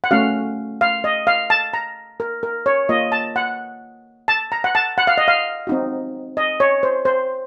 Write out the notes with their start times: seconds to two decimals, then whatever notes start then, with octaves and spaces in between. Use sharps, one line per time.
0.04 F#5
0.11 A3 C#4 F#4 F5
0.81 F5
1.04 D#5
1.27 F5
1.50 A5
1.74 A#5
2.20 A#4
2.43 A#4
2.66 C#5
2.89 A#3 F4 D#5
3.12 A5
3.36 F#5
4.28 A5
4.52 A#5
4.64 F#5
4.75 A5
4.98 F#5
5.07 F5
5.18 D#5
5.28 F5
5.67 C4 D#4 F#4
6.37 D#5
6.60 C#5
6.83 C5
7.05 C5